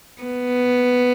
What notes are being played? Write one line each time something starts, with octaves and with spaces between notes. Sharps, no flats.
B3